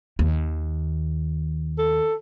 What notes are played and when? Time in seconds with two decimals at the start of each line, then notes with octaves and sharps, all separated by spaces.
0.19 D#2
1.78 A4